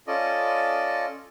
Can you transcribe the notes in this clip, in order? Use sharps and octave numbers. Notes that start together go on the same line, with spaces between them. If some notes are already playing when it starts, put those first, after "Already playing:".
C#4 F4 A4 D5 D#5